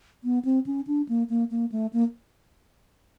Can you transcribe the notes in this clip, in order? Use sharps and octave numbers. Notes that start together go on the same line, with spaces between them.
B3
C4
C#4
D4
A#3
A#3
A#3
A3
A#3